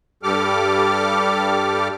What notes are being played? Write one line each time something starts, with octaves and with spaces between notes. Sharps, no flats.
G2 G3 G4 A4 D6 F6